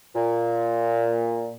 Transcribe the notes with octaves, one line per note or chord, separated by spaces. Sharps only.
A#2